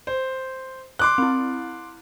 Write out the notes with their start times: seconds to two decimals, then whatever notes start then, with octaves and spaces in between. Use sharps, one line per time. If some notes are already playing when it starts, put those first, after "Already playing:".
0.07 C5
0.99 C6 D6 F#6
1.18 C4 E4